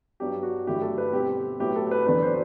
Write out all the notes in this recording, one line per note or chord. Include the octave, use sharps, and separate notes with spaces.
G2 F#3 B3 D4 G4
F#4
G2 D3 F#3 A3 E4 G4
A4
B4
B2 G3 C4 G4
A2 F#3 B3 E4 G4
A4
B4
E2 D3 F#3 B3 D4 B4
C5